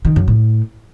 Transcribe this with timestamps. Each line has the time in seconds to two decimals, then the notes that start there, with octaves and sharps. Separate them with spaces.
0.05 D#3
0.16 F#2
0.28 A2